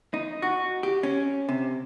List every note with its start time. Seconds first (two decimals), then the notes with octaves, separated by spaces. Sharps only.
0.14 D#4
0.42 F#4
0.83 G4
1.03 C#4
1.49 C3